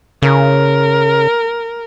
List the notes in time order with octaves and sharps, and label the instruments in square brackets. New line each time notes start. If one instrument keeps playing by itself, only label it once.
[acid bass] C#3 [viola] A#4